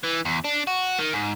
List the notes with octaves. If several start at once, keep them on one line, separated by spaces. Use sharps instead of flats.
E3
E2
D4
F#4
D#3
G#2